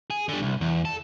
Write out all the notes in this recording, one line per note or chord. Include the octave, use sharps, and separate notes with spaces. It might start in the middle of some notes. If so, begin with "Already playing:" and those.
G#4
D3 G3
C2
E2
A4